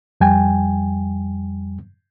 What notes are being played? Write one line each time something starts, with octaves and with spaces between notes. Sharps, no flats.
F2 G3 G5 G#5